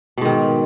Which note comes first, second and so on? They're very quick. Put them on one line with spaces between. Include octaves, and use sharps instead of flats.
B2 G#2 D#3